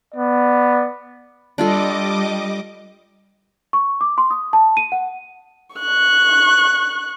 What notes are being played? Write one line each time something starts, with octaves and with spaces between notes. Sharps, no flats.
B3 D5
G3 D4 F4 A4 D#5 D6
C#6
D6
C6
D#6
A5
D#7
F#5
C#6 F#6